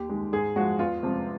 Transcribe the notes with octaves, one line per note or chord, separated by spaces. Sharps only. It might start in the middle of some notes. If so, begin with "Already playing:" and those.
Already playing: D#2 G4
D#3 G#3
G#2 G#4
F3 G#3 F#4
E2 F4
C3 F3 G#3